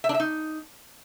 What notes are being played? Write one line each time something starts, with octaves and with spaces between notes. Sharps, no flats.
E5
D4
E5
D#4